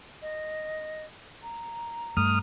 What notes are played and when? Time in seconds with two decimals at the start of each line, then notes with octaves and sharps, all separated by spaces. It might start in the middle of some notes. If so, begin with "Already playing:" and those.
0.22 D#5
1.43 A#5
2.17 G2 A3 D#6 F6